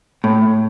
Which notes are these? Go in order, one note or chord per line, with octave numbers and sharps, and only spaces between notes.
A2